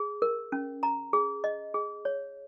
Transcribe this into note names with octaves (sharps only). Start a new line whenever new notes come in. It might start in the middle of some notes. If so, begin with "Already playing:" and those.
Already playing: G#4
A#4
C#4
A#5
G#4
D#5
G#4
C#5